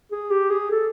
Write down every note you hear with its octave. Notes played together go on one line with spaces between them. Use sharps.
G#4
G4
G#4
A4